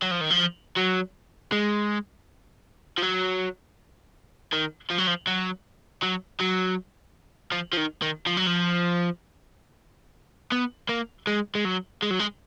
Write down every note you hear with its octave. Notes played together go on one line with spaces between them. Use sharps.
F#3
F3
D#3
F3
F#3
G#3
F3
F#3
D#3
F3
F#3
F3
F#3
F#3
F#3
F3
F3
D#3
D#3
F3
F#3
F3
B3
A#3
G#3
G#3
F#3
G#3
F#3
G#3